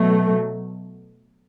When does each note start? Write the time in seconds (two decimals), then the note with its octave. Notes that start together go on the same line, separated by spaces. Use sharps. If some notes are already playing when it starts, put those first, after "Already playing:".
Already playing: B2 F#3 A3